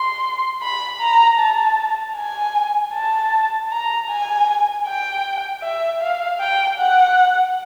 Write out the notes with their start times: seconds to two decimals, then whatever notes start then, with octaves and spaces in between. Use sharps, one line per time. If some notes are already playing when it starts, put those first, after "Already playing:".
Already playing: C6
0.62 B5
1.01 A#5
1.39 A5
2.16 G#5
2.94 A5
3.71 A#5
4.09 G#5
4.86 G5
5.63 E5
6.01 F5
6.40 G5
6.79 F#5